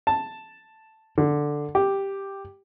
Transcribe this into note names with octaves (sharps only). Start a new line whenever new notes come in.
A5
D3
G4